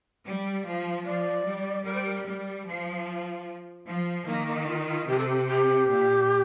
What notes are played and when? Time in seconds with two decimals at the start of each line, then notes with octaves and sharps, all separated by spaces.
0.24 G3
0.65 F3
1.05 F3 D5
1.45 G3
1.85 G3 A#4
1.94 C5
2.05 A#4
2.25 G3
2.65 F3
3.87 F3
4.26 D#3 A#3
4.46 A#3
4.67 F4
4.80 D#4
4.88 F4
5.07 C3 G4
5.19 A4
5.29 G4
5.47 G4
5.87 A#2